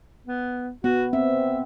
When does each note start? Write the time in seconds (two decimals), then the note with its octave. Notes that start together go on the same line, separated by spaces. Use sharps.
0.26 B3
0.84 B3 F#4
1.13 C4 E5